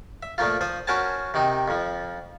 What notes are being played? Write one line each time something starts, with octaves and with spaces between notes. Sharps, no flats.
E5
A#2 F3 A3 A#3 F4
F3 C5 D#6
C#4 F#4 A#4 C5 G#5 A5
C3 D#3 C4 D#4
F2 F3